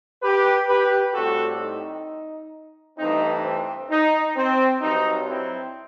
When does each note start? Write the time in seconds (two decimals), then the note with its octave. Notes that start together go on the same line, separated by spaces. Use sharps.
0.22 G4 B4
0.68 G4 B4
1.14 A2 G3 C4 F#4 A4
1.60 D#4
2.98 G2 E3 A3 C4 D#4
3.44 C4
3.90 D#4
4.36 C4
4.81 G2 F#3 C4 D#4
5.28 C4 E4